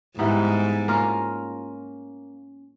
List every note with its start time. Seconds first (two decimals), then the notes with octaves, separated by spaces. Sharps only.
0.18 G#2 E3 G3 B3 D#4
0.88 A#3 C#4 F4 A#4